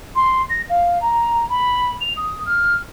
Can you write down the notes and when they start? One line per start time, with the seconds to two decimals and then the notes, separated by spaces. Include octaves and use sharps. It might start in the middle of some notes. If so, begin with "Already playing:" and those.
0.15 C6
0.50 A#6
0.69 F5
1.01 A#5
1.49 B5
2.01 F7
2.17 D#6
2.46 F6